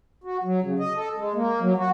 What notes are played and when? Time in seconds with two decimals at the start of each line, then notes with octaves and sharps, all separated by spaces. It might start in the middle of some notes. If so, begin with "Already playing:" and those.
0.24 F#4
0.44 F#3
0.62 C#3
0.79 D#5
0.95 A4
1.16 G#3
1.35 A#3
1.61 F#3
1.77 F#4